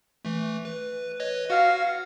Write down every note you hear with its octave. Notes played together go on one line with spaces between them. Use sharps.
E3 A3
B4
B4 C#5 D#5
F#4 F5 F#5